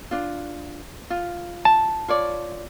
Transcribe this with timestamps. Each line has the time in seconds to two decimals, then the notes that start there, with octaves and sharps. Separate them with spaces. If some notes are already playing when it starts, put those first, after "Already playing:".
0.11 D4 F4
1.10 F4
1.65 A5
2.08 F4 C#5 D5